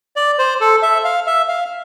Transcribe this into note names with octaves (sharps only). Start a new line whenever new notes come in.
D5
C5
A4
E5
F5
E5
F5